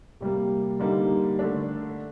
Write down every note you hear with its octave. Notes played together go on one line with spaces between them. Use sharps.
C3 G3 A#3
D3 G3 A#3 D#4
D3 A3 D4